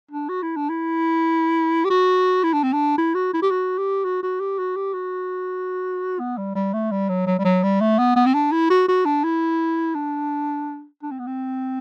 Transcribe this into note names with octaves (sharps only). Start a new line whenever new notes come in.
D4
F#4
E4
D4
E4
G4
F#4
E4
D4
C4
D4
E4
F#4
E4
G4
F#4
G4
F#4
F#4
G4
F#4
G4
F#4
B3
G3
G3
A3
G3
F#3
F#3
G3
F#3
G3
A3
B3
B3
C4
D4
E4
F#4
F#4
D4
E4
D4
D4
C4
B3
C4